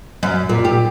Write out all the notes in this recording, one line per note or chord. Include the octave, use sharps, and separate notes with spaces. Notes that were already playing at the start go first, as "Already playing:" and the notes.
F#2
A#2
G4